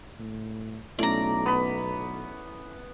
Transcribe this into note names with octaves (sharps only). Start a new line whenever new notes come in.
A2
B1 A3 C#4 E4 D5 A#5
B3 B5